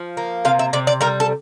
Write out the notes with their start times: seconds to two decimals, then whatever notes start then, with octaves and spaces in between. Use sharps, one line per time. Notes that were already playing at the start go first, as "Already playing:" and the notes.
Already playing: F3
0.17 A#3
0.45 C3 F5
0.59 E5
0.73 C3 D5
0.87 D5
1.01 G3 A#4
1.20 A4